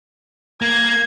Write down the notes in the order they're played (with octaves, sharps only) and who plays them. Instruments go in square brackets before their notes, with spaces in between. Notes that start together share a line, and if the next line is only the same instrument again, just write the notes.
[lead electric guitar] A#3 [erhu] G#6